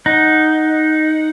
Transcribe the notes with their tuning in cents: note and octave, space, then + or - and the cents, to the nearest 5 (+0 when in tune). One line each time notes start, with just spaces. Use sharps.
D#4 +0 F#5 +0